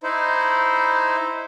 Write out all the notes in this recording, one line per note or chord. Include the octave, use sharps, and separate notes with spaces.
D#4 E4 C5